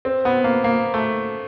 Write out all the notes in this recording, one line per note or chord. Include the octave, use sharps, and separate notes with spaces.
C4
B3
A#3
A#3
A3